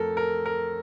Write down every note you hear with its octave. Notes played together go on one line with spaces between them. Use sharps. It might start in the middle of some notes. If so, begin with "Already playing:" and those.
Already playing: F2 A3 A4 A#4
A#4
A#4